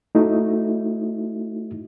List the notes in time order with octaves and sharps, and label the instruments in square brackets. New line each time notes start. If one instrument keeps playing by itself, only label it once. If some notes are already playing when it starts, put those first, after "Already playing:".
[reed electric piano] A3 D#4 E4 F#4